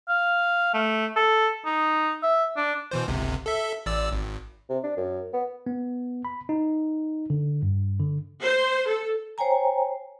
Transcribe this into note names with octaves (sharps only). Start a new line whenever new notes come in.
F5
A3
A4
D#4
E5
D4
B2 E3 C5
G1 C#2 C3
A4 E5
A1 D5 E6
G#1
C3
D4
F#2
B3
B3
B5
D#4
D3
G2
D3
C5
A4
C5 C#5 G5 G#5 A#5